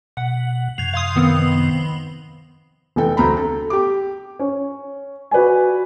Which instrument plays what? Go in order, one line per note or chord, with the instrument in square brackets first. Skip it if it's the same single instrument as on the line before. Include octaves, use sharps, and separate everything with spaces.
[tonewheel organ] B2 [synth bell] F#5
[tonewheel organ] F#2 C3 F3 [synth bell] G#6 F7
[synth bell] F5 C6 D#6
D#3 B3 C4
[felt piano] F1 E3 A4 G5
D2 C4 A#5 B5
A4
G4 D6
[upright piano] C#4
F#4 B4 D5 G#5